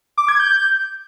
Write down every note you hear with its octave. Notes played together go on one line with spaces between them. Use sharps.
D6
G#6
G6